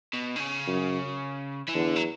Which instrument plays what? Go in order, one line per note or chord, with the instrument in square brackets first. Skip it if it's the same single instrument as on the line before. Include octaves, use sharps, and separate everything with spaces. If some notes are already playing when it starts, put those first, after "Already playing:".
[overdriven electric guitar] B2
D3
C#3
[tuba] F#2
[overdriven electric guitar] E3
[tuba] E2 [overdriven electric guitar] D3
[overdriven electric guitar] F#3